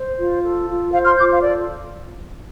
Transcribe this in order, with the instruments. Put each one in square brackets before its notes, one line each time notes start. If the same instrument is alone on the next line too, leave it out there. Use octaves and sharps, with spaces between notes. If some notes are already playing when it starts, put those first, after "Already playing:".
Already playing: [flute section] C5
F4
A4
F4
C5 F5
C6 F6
F4 D6 G6
F5
A4 D5